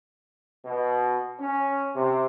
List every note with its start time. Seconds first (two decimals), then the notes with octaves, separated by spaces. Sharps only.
0.65 B2
1.39 C#4
1.95 C3